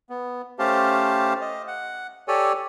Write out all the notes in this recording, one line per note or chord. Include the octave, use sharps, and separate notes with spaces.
B3
A3 C#4 G4 C5 F5 A5
D#5
F#5
G4 A4 C#5 D5 G#5